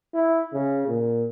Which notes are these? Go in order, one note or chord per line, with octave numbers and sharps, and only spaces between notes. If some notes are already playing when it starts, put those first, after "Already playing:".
E4
C#3
A#2